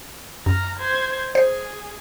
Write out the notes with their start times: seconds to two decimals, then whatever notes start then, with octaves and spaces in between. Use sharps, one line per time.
0.46 F#2 A#5 F6
0.78 C5 G#6
1.35 G#4 C5